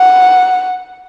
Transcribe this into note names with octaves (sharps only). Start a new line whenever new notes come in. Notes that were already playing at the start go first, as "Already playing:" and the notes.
Already playing: F#5